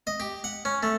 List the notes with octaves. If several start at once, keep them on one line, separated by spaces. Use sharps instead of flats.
D#5
G4
F#5
C#4
A3